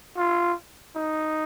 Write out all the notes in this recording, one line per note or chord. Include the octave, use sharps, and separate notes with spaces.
F4
D#4